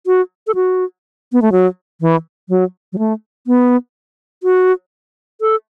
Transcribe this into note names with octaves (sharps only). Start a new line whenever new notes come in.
F#4
A4
F#4
B3
A3
F#3
E3
F#3
F#3
A3
B3
F#4
A4